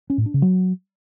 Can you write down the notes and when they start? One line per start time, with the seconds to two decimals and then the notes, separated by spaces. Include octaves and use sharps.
0.10 C#4
0.18 A2
0.26 D4
0.34 C#3
0.42 F#3